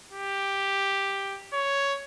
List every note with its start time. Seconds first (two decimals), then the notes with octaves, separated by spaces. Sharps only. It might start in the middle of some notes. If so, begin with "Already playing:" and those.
0.13 G4
1.53 C#5